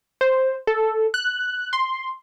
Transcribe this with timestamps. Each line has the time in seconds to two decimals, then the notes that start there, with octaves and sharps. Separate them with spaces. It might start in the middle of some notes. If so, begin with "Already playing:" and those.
0.21 C5
0.67 A4
1.14 F#6
1.73 C6